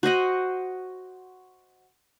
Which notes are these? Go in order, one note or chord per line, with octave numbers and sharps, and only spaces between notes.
F#4 C5 D#5 F#5